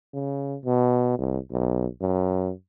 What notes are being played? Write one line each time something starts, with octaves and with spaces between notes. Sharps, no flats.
C#3
B2
C2
B1
F#2